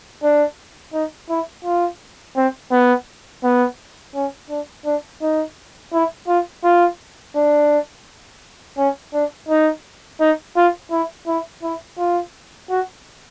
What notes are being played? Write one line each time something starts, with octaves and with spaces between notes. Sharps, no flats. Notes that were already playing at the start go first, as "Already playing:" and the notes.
D4
D#4
E4
F4
C4
B3
B3
C#4
D4
D4
D#4
E4
F4
F4
D4
C#4
D4
D#4
D#4
F4
E4
E4
E4
F4
F#4